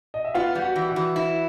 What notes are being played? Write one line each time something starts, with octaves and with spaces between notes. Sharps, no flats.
D#5
E5
B3 F4 F5
G3
F#4 F#5
E3
F#4 F#5
E3
E4